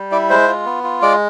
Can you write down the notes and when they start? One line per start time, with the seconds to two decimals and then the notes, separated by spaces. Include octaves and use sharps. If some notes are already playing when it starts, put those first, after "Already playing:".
Already playing: G3
0.12 E4 D5
0.30 G#3 C5
0.48 F4
0.65 B3
0.84 F4
1.02 G#3 D5